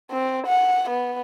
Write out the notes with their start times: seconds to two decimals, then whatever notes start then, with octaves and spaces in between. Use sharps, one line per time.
0.11 C4
0.46 F#5
0.89 B3